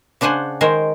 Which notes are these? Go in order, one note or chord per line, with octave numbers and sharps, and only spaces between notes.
C#3 D4 C5 F#5 G#5
D#3 G#3 A#4 C5